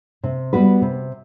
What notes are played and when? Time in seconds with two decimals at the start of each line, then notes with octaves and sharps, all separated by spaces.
0.24 C3
0.53 G3 B3 F#4 B4
0.82 C3